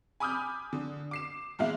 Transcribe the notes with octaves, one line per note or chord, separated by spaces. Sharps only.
G#5 B5 D6 D#6 F6 G6
D3
D6 C7 E7
E2 A#2 G#3 E4 F5